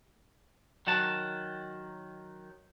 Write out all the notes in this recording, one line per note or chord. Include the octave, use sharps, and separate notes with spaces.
D#3 F#3 F#5 A5